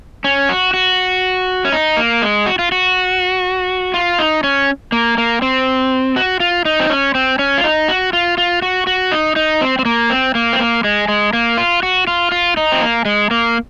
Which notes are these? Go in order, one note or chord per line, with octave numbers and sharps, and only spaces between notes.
C#4
F#4
F#4
C#4
D#4
A#3
G#3
F#4
F4
F#4
F4
D#4
C#4
A#3
A#3
C4
F#4
F4
D#4
C4
C#4
C4
C#4
F4
D#4
F#4
F4
F4
F#4
F#4
D#4
D#4
C4
C4
A#3
C4
A#3
C4
A#3
G#3
G#3
A#3
F4
F#4
F4
F4
D#4
C4
A#3
G#3
A#3